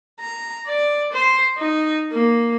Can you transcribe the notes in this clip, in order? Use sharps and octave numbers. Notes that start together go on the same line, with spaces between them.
A#5
D5
C5
D#4
A#3